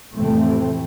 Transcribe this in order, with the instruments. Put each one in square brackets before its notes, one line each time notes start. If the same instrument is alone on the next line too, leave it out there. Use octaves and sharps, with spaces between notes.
[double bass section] F2 A2 C3 E3 A3 C4